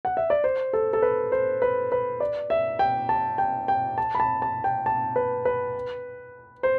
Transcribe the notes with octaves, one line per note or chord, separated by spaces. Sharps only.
F#5
E5
D5
C5
A4
A4
B4
C5
B4
B4
D5
E5
G5
A5
G5
G5
A5
B5
A5
A5
G5
A5
B4
B4
C5